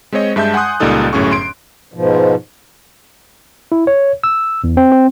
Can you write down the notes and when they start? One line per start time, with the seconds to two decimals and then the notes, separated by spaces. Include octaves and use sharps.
0.12 G#3 C4 C5 C#5 D#5
0.36 G2 G#3 E5 A5 G6
0.54 F#5 G#5 C6 D#6 F#6
0.80 C#2 A#2 G3 D#4 A4 D#6
1.13 G1 F#2 A2 C#4 G#4 C#6
1.31 C6 D7
1.94 G#2 B2 F3
3.72 E4
3.87 C#5
4.24 E6
4.64 E2
4.77 C4
4.92 C4